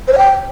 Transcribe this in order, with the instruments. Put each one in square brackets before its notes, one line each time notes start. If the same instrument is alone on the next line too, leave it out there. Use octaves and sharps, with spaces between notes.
[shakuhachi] C5
C#5
G5